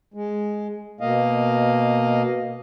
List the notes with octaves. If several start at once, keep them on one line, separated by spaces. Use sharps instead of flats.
G#3
B2 A#3 D#5 F5